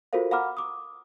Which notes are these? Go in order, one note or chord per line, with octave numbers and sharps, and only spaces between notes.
F4 F#4 A4 A#4 C5 F5
F5 F#5 A#5 B5 D6 F6
D6 D#6